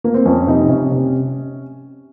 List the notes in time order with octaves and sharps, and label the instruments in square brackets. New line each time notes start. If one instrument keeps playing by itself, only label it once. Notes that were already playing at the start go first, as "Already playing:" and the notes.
[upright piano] A#3
C4
F2 C#4
C3 D#4
C3 C#4
C3